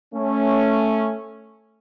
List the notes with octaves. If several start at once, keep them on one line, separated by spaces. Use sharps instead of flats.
A3 C#4